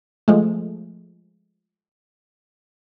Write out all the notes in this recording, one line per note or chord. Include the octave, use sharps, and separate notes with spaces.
F3 G#3 A3